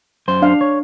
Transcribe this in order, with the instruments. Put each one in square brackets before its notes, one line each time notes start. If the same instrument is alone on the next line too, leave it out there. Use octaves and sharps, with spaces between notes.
[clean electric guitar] F#2 C5
[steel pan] D4 F5
[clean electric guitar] C#5